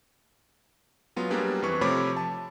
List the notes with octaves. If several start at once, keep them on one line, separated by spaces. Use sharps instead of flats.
F#3 G#3 B3 F4
F#3 G3 A#3 B3 D4 G#4
F2 E3 B4 C#6
C3 F3 A3 C#5 B5 D6
A5